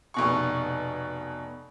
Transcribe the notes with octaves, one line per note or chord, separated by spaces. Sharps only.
F1 B2 C#6